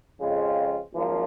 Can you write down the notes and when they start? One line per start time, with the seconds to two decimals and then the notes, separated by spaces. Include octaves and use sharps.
0.20 F2 C#3 G#3 C4 F4
0.93 G#1 F#2 F3 A#3